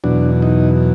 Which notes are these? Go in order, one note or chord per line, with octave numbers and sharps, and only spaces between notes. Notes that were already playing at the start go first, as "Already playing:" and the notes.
E2 B2 F#3 D4
D#4